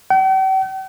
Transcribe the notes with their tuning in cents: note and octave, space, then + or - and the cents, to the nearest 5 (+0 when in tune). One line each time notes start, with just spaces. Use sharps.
G5 -45